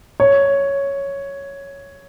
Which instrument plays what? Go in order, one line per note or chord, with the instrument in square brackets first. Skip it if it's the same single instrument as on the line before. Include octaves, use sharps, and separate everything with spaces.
[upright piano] C#5